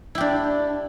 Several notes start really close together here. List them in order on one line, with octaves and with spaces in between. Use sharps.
E4 G4 D4